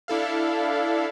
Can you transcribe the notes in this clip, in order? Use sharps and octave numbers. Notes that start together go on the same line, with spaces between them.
D4 E4 A4 F5